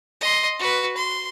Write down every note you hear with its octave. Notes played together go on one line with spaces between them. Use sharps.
D#5 C6
F#4 B4
C6